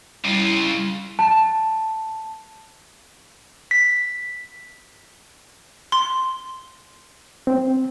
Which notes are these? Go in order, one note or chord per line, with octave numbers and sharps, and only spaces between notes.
C#3 G3 E4 F4
A5
B6
C6
C4